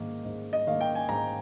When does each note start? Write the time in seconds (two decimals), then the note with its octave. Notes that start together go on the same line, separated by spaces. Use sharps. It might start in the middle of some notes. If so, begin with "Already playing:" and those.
Already playing: G#2 D#3 A#3
0.25 G#2
0.53 D#5
0.67 D#3 A#3 F5
0.81 G5
0.95 G#5
1.09 G#2 A#5